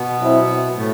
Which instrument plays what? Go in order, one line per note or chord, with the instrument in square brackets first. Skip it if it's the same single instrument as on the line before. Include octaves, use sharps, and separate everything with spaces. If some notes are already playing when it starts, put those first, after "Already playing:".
Already playing: [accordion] B2 B3
[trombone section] F#3 C4 E4
[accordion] A2 A3